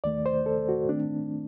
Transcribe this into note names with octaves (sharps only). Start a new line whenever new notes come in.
D#2 D#3 A3 D5
C5
A4
F#4
D#3 A3 C4 D4